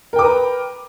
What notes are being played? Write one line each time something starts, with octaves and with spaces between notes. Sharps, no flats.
A#4 B4 G5 A#5 D6